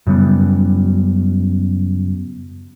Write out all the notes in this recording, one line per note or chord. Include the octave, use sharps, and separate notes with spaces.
F#2 C#3 G3 B3